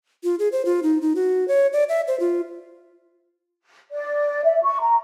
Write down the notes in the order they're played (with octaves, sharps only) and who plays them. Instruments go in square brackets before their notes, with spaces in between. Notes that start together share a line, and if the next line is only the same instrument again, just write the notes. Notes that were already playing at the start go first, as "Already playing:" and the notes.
[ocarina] F4
G#4
C5
F4
D#4
D#4
F#4
C#5
D5
E5
C5
F4
[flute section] D5
E5
C#6
A#5